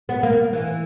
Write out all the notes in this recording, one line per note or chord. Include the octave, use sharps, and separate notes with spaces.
B3
A#3
E3